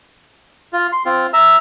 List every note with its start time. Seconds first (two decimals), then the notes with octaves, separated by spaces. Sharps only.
0.73 F4
0.92 C6
1.05 C4 F4
1.33 E5 A#5 E6